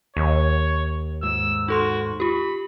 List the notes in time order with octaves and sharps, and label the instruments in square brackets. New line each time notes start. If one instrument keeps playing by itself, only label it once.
[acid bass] D#2 [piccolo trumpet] C#5
[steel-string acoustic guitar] G#2 [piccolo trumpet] E6
[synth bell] D#4 A4 C6 [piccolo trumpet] F#4
[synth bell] F4 G4 [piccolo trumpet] B5